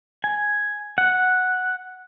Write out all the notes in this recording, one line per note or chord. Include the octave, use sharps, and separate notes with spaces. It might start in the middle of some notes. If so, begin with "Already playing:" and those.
G#5
F#5